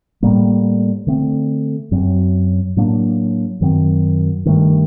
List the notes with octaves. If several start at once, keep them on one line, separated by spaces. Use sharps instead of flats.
A2 G3 A#3
D3 A3 C4
F#2 F#3 C4
A2 F#3 A#3 D4
F#2 D#3 F#3 C4
G2 D#3 A3